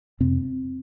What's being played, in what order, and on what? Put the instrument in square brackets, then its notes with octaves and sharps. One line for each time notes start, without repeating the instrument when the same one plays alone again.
[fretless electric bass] F2 C3 C4